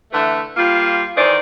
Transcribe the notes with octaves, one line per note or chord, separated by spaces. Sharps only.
D3 E3 A3
G3 A#3 F4
D#3 E3 G#4 C5 D5